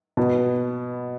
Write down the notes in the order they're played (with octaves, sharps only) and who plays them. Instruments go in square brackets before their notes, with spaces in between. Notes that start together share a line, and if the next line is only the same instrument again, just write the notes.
[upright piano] B2 B3